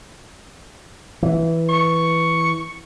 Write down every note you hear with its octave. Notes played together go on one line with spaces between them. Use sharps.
E3
C#6